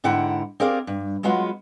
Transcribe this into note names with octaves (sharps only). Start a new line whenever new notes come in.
G#2 D3 E4 F#5 G5 A#5
C4 G4 G#4 A#4 D5 F5
G2
F#3 G#3 B3 F4 F#4